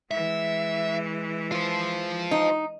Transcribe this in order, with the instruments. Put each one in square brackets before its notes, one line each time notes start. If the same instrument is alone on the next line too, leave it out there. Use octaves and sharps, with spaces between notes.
[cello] E3 G#3 [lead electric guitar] E5
[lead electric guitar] F4 C5
[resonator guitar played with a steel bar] D#4